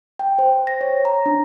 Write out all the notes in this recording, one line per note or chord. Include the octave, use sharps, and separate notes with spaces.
G5
C5
A#6
C#5
A#5
D4